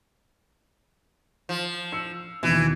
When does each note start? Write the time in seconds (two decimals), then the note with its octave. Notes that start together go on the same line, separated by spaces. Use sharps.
1.49 F3
1.92 E6 C#7
2.43 D#2 B2 E3